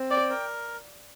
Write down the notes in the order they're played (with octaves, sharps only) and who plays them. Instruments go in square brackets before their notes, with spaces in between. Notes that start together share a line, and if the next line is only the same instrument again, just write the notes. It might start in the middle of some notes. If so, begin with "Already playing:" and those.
Already playing: [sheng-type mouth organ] C4
[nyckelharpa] D5 [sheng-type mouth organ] G5
[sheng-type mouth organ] A#4